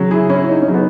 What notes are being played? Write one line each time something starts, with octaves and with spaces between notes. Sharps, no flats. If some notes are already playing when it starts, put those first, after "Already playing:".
Already playing: C#3 F#3
E4 G#4
C#4 E4
D#4
C#4
C#3 F#3
B3 D#4